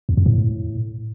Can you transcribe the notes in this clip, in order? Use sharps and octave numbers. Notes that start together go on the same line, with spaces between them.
E2
F2
A2